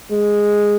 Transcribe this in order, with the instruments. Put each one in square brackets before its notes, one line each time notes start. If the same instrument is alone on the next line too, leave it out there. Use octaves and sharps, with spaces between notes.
[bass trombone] G#3